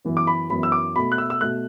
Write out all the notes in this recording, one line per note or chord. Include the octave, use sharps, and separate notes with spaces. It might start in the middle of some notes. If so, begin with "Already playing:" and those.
F#2 E3 B3
D6
B5
F#2 E3 B3 B5
E6
D6
B2 A3 B5
F#6
E6
E6
B2 A3 F#6